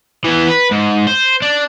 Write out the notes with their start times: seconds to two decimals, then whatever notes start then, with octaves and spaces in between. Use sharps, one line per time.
0.24 E3 B3
0.48 B4
0.71 G#2
1.07 C5
1.42 D4